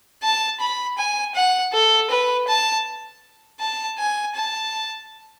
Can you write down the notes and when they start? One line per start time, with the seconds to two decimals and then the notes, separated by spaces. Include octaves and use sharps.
0.23 A5
0.60 B5
0.98 G#5
1.35 F#5
1.73 A4
2.10 B4
2.48 A5
3.60 A5
3.99 G#5
4.35 A5